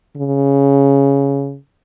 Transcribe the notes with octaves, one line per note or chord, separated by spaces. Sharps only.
C#3